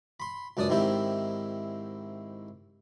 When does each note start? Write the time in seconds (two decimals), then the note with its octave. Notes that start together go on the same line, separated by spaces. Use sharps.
0.20 B5 C6
0.57 C#2 F#2 D4 D5 D#6
0.69 G#2 D#3 C4 E4 G4